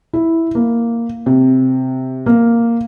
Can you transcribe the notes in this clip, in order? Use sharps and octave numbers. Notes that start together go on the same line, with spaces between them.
E4
A#3
C3
A#3